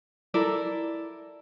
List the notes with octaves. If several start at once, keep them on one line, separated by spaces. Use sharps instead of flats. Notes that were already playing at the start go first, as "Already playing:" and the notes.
E4 A4 A#4 D5